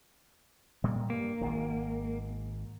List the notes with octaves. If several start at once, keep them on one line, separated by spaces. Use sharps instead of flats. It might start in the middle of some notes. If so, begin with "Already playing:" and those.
A#2 G3 A#3
G2 A#3
G#1 G#2 D#3